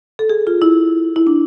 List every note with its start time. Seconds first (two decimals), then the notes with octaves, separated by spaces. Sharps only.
0.19 A4
0.30 G#4
0.47 F4
0.62 E4
1.16 E4
1.27 D4